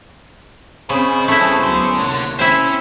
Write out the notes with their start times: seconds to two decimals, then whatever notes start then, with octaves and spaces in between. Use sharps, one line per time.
0.90 C#3 C4 C#4 G#4 C5 D#5 B5 C#6
1.28 G2 A3 E4
1.63 C#2 D3 F#3 B3
1.98 C3 A#3 C#5 F#6
2.39 C4 C#4 E4 C5